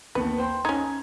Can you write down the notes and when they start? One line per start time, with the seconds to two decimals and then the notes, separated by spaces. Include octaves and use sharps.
0.15 D#2 B3 B4 A5
0.38 C5 G5 C6
0.65 C#4 D#4 G#6